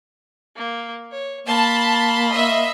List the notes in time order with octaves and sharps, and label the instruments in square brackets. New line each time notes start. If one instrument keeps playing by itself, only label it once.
[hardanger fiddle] A#3
C#5
[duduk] A#3 [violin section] A5 [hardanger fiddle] B5 C6
[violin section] D#5 E5